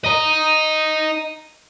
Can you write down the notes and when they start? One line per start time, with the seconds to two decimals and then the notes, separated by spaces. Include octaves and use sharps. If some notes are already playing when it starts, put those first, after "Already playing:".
0.04 D#5 A#5